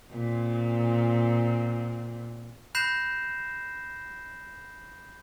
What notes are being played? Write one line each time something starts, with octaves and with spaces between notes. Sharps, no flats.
A#2 C4
B5 F#6 G6 A#6 C7 E7